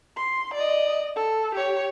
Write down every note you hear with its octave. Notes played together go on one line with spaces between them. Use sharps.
C6
D5 D#5
A4
G4 C#5